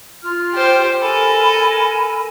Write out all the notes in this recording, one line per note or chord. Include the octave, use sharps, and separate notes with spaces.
F4 F6
G4 C5
A4 A#4 G#5 B5